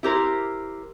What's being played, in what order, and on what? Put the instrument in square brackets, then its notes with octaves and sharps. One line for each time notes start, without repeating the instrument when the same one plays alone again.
[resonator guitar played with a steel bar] E4 G4 A#4 C5